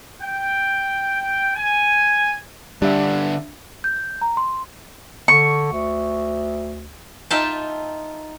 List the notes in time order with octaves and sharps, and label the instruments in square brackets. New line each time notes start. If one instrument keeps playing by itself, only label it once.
[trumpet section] G5
G#5
[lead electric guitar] G2 D3 [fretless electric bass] G3 [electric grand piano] D4 E5
[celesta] G6
A#5
C6
[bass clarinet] D3 [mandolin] C#6
[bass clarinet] D2
[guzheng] D#4 F4 E5 G5 A5